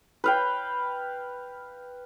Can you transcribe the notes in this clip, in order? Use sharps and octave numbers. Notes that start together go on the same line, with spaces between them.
B4 F5 G5